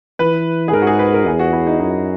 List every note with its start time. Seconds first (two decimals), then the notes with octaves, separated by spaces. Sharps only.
0.19 E3 B4
0.68 G#4
0.73 G#2 A#4
0.82 F#4
0.87 G#4
0.99 B4
1.14 A#4
1.26 E2 G#4
1.39 F#4
1.53 E4
1.67 D#4
1.79 F#2 D#4